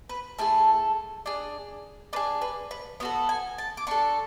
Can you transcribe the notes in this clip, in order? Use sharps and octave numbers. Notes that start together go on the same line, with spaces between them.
B4
A3 E4 G#4 A4
D4 G#4
D4 G#4 B4
B4
B4
B3 F#4 A4 C#5
G#5
A5
D6
D4 A4 C#6